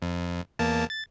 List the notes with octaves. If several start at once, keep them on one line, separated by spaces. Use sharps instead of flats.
F2
E2 A#3 A5
A6